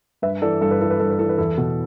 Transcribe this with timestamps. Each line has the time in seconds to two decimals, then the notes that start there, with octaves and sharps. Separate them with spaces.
0.22 G2 B4 E5
0.42 E3 A4 D5
0.61 G2 A4
0.71 B4
0.81 E3 A4
0.90 B4
0.99 G2 A4
1.10 B4
1.19 E3 A4
1.29 B4
1.38 E2 E4 A4
1.58 B2